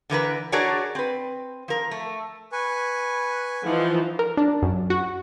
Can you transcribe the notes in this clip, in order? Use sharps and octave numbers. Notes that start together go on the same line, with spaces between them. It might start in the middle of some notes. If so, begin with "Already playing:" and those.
D3 E3 A#4 B4
D4 F#4 G#4 A#4 C#5 D5
C4 B4
F3 A#4
A3
B4 G#5 C#6
E3 F3 D#4 F#5
A#4
D4
F#2
F#4